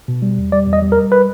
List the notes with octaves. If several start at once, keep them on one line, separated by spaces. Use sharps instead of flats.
B2
G3
E2
G3 D5
E2
D#5
G3
A#4
G3
B4